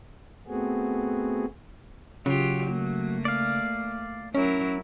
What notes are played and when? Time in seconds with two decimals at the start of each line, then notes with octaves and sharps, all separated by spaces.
0.47 A3 B3 C4 F#4 G#4
2.26 C#3 F#3 F4 G4
2.67 A3 A#3
3.25 D5 F5
4.35 F#3 C#4 E4 A#4